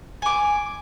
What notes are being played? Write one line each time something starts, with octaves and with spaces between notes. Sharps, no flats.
G#5 D6